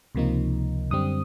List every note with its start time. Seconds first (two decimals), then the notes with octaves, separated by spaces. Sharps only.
0.15 C#2 C3 F3 A#3 D#4
0.90 F#2 D3 G3 C4 D#6